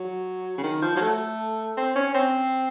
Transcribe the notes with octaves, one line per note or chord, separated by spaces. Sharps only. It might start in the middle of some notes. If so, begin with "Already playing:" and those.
Already playing: F#3
C#3
D#3
F3
F#3
A3
C4
C#4
C4